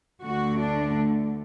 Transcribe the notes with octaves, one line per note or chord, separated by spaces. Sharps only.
D2 D3 A3 F#4
D4